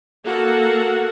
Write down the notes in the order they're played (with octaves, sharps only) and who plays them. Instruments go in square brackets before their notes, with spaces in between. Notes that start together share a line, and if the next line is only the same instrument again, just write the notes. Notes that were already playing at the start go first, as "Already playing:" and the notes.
[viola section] A#3 F#4 A4 F#5